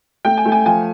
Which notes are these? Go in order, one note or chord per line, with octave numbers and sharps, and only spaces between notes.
A3 G5
G#5
A3
G#5
F3 G#5